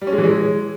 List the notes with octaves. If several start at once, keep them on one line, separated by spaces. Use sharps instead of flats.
G3
C#4
G#3
E3
G#3